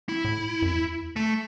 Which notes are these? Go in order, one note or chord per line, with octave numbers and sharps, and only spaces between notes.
E4
A2
F#2
E2
A3